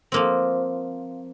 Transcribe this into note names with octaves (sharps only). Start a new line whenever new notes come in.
F3 A#3 C4